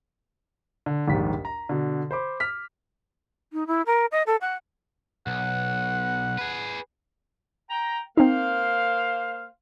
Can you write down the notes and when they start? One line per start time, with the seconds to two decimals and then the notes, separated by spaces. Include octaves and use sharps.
0.86 D3
1.08 A#1 D#2 G#2 G3 B6
1.45 A#5
1.69 B2 D3
2.11 C5 B5 D6
2.40 F6 B6
3.53 D#4
3.67 E4
3.86 A#4
4.11 D#5
4.26 A4
4.41 F#5
5.27 B1 F#5
6.38 G#4 B4
7.70 G5 A#5
8.17 A#3 C4 D#4 C5 F5